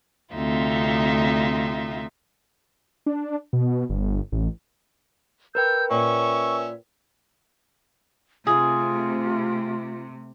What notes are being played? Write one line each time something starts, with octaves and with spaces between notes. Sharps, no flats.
D2 C3 C4 D#4 F4 E5
D4
B2
G1
A1
A#4 B4 G5 E6 G6
A#2 C#4 E5 C#6
C3 A3 F4 G#4